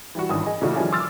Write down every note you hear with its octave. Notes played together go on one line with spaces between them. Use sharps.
E3 G3 F#4
G#1 G2 D#3 E3 C#4 D#6
G#4 D#5
A#2 C#3 E3 A3 D4 F#4
D#3 F3 G3 C#4 E4 G#4
C6 D6 E6 F6 A6